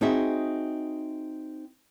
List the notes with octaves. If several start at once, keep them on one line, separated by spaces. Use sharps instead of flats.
C4 D#4 F#4 G#4 E5